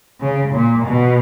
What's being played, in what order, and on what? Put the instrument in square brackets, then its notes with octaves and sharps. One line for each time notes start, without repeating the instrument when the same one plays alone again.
[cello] C#3
A#2
B2